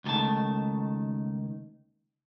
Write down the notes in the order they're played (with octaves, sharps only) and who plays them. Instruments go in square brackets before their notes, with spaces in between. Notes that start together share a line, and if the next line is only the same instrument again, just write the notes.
[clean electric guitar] C#2 A2 D#3 A3 A5